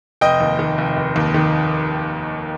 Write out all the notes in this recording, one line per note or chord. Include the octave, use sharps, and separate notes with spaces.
F1 D#5 G5
D#2
D#3
F1
F1
D#2
D#3